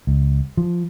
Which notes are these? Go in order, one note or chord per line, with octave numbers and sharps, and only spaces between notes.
C#2
F3